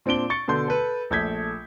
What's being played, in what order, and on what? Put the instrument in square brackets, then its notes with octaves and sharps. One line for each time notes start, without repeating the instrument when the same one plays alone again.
[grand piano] A#2 C4 D4 D7 G7
C#6 A6 C#7
B2 D3 A4 C6 G6
A4 B4
A#1 A3 G6 G#6 B6